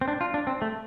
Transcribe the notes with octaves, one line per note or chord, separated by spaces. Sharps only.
C4
D4
F4
D4
C4
A3